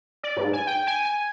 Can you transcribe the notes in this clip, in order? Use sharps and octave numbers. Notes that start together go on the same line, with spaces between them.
D5
G#2
G#5
G5
G#5
G#5